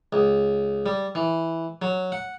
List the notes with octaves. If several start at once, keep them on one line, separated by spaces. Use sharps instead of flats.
C#2
G3
E3
F#3
F#5